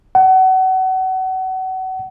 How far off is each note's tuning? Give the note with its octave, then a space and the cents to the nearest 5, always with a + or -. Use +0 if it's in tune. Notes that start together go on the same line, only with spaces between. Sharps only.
F#5 +30